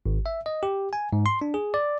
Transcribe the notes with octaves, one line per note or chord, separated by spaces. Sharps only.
G#1
E5
D#5
G4
G#5
G#2
C6
D4
G#4
D5